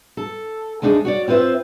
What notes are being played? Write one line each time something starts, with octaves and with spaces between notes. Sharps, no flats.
A4
D2 G#3 D4 D#4 G4 G#4
F#4 C#5 D5
C4 F4 B4 C5 E5